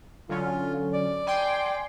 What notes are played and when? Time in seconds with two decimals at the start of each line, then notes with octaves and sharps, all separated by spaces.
0.29 D3 F#3 C#4 F4
0.93 D5
1.27 G5 G#5 C6